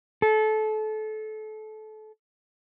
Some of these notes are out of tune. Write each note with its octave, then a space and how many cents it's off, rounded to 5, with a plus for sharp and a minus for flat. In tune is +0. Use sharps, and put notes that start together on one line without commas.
A4 -25